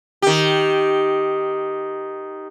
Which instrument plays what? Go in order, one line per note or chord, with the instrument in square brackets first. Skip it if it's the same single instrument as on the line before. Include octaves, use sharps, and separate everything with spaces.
[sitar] D#3 G4